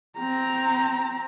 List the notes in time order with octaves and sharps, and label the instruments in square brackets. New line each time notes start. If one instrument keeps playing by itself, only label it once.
[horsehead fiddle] C4 A#5